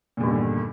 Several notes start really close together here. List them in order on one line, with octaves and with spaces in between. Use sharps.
A#2 E2 G2 D#3 D3